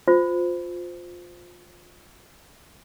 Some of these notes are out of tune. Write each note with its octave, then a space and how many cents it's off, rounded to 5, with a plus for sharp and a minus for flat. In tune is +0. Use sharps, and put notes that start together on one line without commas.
F4 +20 C5 -15